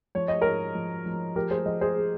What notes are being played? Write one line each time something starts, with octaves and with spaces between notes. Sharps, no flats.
F3 C#5
D#5
G#2 A#4 C#5
F3
F3
F3 G4 A#4
G#4 C5
F3 C5 D#5
G#4 C5
G#3